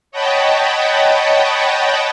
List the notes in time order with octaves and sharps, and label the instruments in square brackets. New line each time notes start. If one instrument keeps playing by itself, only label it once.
[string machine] C#5 D#5 F#5 G5 A5 B5